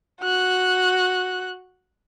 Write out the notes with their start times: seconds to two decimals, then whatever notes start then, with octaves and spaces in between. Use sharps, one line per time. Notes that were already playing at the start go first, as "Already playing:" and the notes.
0.21 F#4 F#6